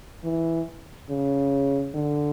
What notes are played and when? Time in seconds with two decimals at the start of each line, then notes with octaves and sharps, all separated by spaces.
0.24 E3
1.09 C#3
1.95 D3